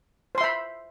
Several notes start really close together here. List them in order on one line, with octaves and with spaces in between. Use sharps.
C5 C6 E5 B5